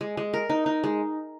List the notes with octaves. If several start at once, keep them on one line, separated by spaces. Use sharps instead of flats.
G#3
G#3
A#4
D#4
D#4
G#3